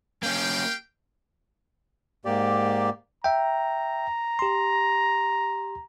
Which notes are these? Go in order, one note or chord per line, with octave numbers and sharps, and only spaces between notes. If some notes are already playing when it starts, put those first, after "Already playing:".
A#3 C#4 G4 F5 G5
G#2 A#3 G4 D5
E5 G5 A#5
G4 C6